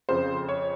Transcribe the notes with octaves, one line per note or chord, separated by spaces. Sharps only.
F2 C#3 F3 C5
C#5